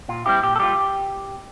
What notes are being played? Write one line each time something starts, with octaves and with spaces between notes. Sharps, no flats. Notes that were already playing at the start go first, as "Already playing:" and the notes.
A#2 F4
G3 C4 E4 G4
A#2 G4
A4
G3 D4 F4 G4